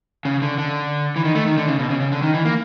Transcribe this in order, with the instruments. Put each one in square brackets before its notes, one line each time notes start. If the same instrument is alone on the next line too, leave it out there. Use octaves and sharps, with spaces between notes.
[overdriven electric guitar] C#3
D3
D3
E3
D#3
A3
D#3
D3
C#3
B2
C#3
C#3
D3
D#3
E3
A#3